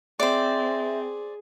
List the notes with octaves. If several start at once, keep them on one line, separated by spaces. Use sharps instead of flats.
C4 G#4 C5 D5 E5